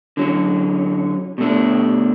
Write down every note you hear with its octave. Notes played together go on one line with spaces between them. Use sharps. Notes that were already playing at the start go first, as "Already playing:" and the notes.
D3 F#3 C#4
B2 A3 D4